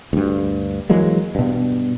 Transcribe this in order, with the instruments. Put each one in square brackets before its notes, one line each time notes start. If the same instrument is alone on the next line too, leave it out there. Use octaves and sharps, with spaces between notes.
[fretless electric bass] D2 G2
E3 F#3 G#3 A#3
G2 B2